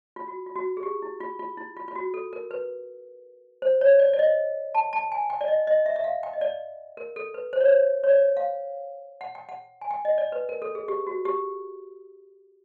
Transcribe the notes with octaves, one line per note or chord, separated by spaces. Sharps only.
F4
F#4
F4
F#4
G#4
G4
E4
F4
F4
E4
F4
F4
F#4
A4
A#4
B4
C5
C#5
D5
D5
D#5
A5
A5
G#5
G5
D5
D#5
D#5
E5
E5
F5
G5
D#5
D5
A#4
A4
B4
C5
C#5
C5
C#5
D5
F5
F#5
G5
F#5
G#5
G5
D#5
D5
B4
A#4
A4
G#4
G4
F#4
G4